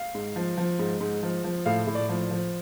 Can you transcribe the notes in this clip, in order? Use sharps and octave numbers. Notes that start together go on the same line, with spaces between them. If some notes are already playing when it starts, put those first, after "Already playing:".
Already playing: F5
G#2
F3
F3
G#2
G#2
F3
F3
A2 F5
A2
D5
F3
F3